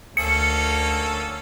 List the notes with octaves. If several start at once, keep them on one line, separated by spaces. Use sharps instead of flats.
D2 A#3 C#4 A4 C#7